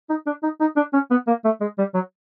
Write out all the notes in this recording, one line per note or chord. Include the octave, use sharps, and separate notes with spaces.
D#4
D4
D#4
D#4
D4
C#4
B3
A#3
A3
G#3
G3
F#3